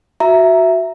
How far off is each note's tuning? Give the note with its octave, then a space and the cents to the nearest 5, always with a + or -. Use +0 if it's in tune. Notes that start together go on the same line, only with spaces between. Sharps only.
F#4 +0 E5 +5 A#5 +0